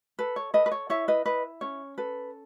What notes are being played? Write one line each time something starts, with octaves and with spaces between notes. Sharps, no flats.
A4 B4
C#5
A4 B4 D#5
B4
C#5
E4 C#5 E5
B4 D#5
E4 B4 D#5
C#4 C#5
A4 B4